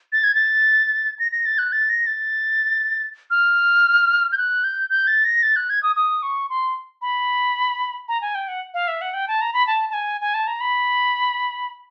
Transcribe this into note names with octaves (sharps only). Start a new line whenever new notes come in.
A6
G#6
A6
A#6
A#6
A6
F#6
A6
A#6
A6
F6
G6
F#6
G6
G6
A6
A#6
A6
F#6
G#6
D#6
D#6
C#6
C6
B5
A#5
G#5
G5
F#5
F5
E5
F#5
G5
A5
A#5
B5
A5
A5
G#5
G#5
A5
A#5
B5